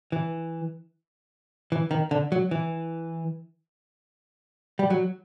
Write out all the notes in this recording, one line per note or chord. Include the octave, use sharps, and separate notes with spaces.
E3
E3
D#3
D3
F#3
E3
G3
F#3